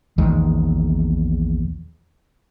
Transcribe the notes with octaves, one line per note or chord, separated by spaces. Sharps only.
A#1 E2 D#3 G#3